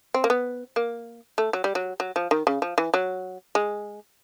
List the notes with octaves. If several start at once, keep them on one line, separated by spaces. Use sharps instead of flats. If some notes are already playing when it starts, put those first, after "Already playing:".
C4
A#3
B3
A#3
A3
F#3
G3
F#3
F#3
F3
D#3
C#3
F3
E3
F#3
G#3